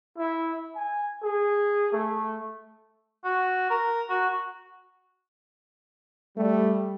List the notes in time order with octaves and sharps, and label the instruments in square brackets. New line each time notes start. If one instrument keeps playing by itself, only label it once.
[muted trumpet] E4
G#5
G#4
A3
[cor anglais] F#4
A#4
F#4
[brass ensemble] G3 [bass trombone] A3